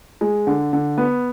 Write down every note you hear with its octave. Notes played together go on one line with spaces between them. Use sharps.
G#3
D3
D3
B3